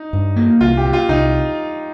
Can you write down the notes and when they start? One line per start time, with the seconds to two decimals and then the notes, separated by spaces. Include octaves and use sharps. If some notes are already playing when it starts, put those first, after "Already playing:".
Already playing: D#4
0.13 G2
0.36 A#3
0.61 C2 F4
0.77 G4
0.85 A#2
0.93 F4
1.09 C2 D#4